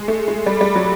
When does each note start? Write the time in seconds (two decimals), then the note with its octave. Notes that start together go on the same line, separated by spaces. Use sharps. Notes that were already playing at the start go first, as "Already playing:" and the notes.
Already playing: G#3
0.08 A3
0.28 G#3
0.46 G3
0.61 G3
0.75 F#3